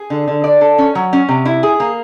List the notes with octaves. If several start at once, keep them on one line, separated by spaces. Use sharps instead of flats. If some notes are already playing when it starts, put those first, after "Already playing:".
Already playing: G#4
D3
D3
D5
A4
C#4
F#3
C#4
C3
E4
G#4
A#3